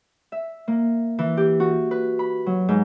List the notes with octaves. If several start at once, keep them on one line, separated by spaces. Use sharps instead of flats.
E5
A#3
E3
G4
F#4
B4
B5
F#3
G#2